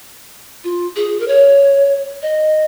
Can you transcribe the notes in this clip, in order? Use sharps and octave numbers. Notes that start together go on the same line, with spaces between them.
F4
G#4
A#4
C#5
D#5